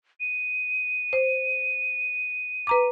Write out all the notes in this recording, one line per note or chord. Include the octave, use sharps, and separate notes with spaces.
D#7
C5
B4 A#5 D6